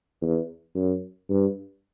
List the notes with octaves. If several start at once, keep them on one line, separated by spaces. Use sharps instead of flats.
E2
F#2
G2